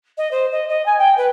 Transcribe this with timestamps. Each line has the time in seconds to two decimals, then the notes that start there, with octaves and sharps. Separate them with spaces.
0.18 D#5
0.31 C5
0.52 D#5
0.69 D#5
0.86 G#5
0.98 G5
1.17 B4